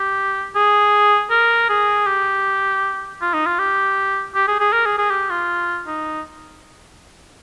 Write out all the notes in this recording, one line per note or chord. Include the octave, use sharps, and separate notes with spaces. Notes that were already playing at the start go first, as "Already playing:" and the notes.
Already playing: G4
G#4
A#4
G#4
G4
F4
D#4
F4
G4
G4
G#4
G#4
A#4
G#4
G#4
G4
F4
D#4